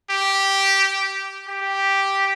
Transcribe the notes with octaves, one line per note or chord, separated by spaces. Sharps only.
G4
G4